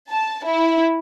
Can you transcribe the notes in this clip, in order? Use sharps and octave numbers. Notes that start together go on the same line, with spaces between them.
A5
E4